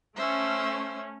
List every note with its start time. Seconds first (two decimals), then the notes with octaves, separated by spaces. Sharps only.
0.16 A3 C#4 C5 E5